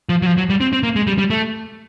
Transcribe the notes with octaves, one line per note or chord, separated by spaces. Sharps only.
F3
F#3
F3
F#3
G3
C4
C4
A#3
G#3
G3
G3
A3